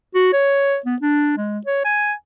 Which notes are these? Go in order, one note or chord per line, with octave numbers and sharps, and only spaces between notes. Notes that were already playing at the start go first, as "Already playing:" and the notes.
F#4
C#5
B3
D4
G#3
C#5
G#5